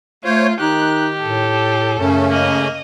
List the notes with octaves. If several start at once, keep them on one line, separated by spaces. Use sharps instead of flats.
A3 F4 C5 C#5
D#3 D#4 G4 F#6
A2 A4
F#2 C#3 A3 C#4
A#3 D#5